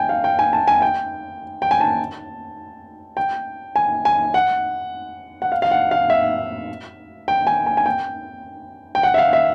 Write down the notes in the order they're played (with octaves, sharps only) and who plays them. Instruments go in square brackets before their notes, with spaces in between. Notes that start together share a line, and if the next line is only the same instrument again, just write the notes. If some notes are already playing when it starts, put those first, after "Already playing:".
Already playing: [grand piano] G5 G#5
F5
G5
G#5
A5
G#5
G5
G5
G#5
A5
G5
G#5
G#5
F#5
F#5
F5
F5
F#5
F5
E5
G5
G#5
G#5
G#5
G5
G5
F#5
E5
F5
E5